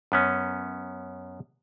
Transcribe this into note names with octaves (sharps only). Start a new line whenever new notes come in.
F#2 B3 C#4